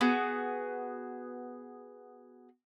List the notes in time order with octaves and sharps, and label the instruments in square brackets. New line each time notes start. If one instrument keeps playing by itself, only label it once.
[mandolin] B3 F#4 G#4